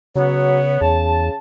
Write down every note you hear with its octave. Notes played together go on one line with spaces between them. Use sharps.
C#3 F#3 B3 C#5
E2 C#3 A5